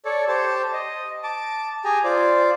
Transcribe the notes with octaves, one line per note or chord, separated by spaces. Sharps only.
A4 C#5 D5
G4 C5 A5
D#5
A5 D6
G4 G#4 G#5 A#5
F4 C5 D5